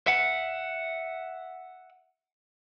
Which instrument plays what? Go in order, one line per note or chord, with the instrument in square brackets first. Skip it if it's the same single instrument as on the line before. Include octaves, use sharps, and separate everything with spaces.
[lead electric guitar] E5 F#5